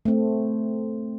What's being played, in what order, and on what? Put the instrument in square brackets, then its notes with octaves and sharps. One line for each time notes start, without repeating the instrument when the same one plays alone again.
[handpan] A3 C4